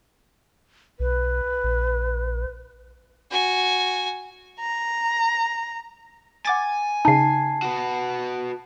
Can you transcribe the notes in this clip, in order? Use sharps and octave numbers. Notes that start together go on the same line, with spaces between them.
B1 B4
A#1
F#4 G#5
A#5
F#5 G#5 D6 A6
C#3 D#4 A5 C7
F#4 B4